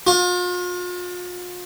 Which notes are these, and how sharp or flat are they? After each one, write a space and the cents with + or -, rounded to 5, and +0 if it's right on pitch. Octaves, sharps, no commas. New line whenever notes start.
F4 +40